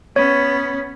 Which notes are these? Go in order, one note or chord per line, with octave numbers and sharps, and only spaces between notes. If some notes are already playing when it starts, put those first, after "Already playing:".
B3 C#4 C#5